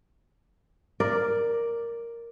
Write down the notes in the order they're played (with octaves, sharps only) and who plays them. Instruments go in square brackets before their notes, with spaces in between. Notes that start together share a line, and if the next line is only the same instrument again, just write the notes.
[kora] A#4 D5